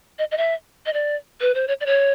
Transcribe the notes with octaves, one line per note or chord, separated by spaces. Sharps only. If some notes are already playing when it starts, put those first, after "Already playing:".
D#5
D#5
E5
D#5
D5
B4
C5
C#5
D5
C#5